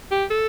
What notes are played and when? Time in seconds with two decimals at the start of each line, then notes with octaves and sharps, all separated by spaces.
0.11 G4
0.30 A4